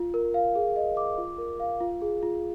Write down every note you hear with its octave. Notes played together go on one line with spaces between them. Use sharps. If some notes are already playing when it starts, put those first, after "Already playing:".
Already playing: F4
A#4
F5
G#4
D#5
D6
F4
A#4
F5
F4
G#4
F4